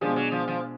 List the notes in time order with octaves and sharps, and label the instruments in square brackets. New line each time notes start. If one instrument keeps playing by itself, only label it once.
[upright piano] B2 G#3 D4 G#4 [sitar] F3
[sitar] F#3
F3
F3